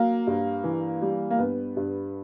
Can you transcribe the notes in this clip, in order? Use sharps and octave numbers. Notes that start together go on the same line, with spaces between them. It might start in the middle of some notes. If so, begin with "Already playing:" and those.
Already playing: F#3 A#3
G2
E3
G3
A#3
G2 B3
G2